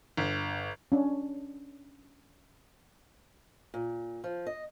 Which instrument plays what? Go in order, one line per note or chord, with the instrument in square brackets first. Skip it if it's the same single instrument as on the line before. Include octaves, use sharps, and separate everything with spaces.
[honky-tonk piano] G1
[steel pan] C#4 D4
[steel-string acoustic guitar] A#2
F3
D#5